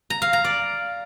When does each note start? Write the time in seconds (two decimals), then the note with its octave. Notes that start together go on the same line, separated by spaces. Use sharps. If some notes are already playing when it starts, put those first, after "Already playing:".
0.10 A#5
0.22 F5
0.33 A#5
0.44 D5